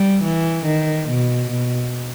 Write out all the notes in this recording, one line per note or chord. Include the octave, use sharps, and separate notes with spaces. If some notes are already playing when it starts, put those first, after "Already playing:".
Already playing: G3
E3
D#3
B2
B2